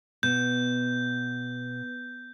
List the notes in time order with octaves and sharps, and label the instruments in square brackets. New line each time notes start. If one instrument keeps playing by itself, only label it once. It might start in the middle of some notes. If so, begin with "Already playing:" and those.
[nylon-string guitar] B2 [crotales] G6